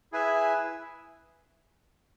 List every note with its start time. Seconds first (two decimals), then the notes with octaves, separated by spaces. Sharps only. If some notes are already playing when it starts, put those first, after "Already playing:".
0.12 E4 G#4 B4 E5 G#5